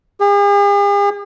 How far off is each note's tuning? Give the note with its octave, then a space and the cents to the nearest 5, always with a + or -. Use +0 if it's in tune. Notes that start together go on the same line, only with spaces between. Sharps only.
G#4 -45